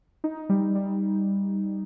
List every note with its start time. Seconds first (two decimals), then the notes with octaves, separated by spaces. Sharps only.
0.24 D#4
0.49 G3
0.75 G3